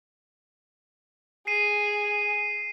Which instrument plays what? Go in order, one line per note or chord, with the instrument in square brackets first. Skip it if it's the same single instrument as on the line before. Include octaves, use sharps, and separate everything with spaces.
[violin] G#4 [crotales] C7 D#7